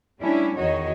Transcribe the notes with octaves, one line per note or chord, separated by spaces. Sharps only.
G3 A3 C#4 D4 E4
E2 D#3 F#4 C#5 D#5